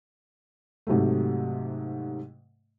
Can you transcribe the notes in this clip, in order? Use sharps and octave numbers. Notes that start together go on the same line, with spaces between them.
G#2 C3 F#3 A3